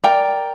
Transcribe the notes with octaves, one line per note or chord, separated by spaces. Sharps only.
A#4 D5 G5 A#5